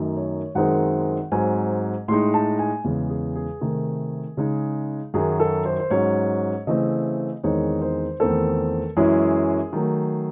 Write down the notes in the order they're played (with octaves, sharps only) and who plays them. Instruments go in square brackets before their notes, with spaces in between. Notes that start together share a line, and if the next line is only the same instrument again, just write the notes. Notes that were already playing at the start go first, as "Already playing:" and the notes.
Already playing: [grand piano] F#2 D#3 A3 D#4
C#5
F#2 D#3 G#3 C4 D#4 F#5
G#2 F#3 C4 G#5
A2 G#3 D#4 C6
A5
G#5
E2 C#3 G#3
G#4
G#4
C3 D#3 A3
C#3 G#3 D#4
F#2 D#3 F#3 G#4
A4
C5
C5
G#2 F#3 C#4 C#5
C#3 E3 A3 C4 D#5
E2 D#3 G#3 C4 D#4 C#5
C5
E2 D#3 A3 C4 A4
F#2 E3 G#3 C#4 E4 G#4
D#3 F#3 A3